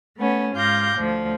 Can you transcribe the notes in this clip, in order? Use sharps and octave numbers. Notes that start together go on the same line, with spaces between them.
A3 B3 C#4
G#2 F4 F5 D6 G6 A#6
D2 F3